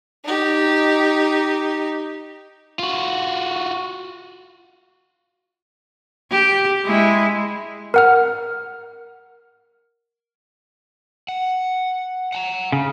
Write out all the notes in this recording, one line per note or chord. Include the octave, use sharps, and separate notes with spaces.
D#4 G4
F4 F#4
G4
G#3 E4
A#4 F#5 F6
F#5
F#5 G#5 A#5
C#3